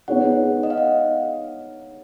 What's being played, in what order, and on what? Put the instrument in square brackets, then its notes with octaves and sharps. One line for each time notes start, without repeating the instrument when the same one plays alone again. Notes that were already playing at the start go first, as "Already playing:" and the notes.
[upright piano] B3 D#4 G#4 C#5 [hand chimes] F#5
[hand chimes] D#5
F5
F#5